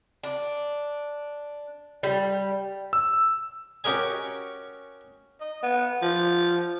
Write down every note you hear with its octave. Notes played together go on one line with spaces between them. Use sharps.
D4
G3
E6
C#4 F#4 G4 A#4 D#5 G#5
D#5
B3
F3